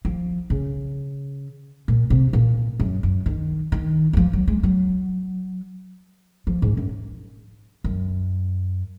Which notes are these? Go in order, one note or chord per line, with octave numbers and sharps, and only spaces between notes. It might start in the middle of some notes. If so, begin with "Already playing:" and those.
F3
C#3
A#2
C3
A#2
F#2
F#2
D#3
D#3
F#3
F3
F#3
G#3
F#3
F3
G#2
F#2
F#2